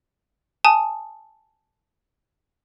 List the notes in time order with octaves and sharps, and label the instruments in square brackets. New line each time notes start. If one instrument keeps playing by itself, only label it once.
[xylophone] G#5 A5 D#6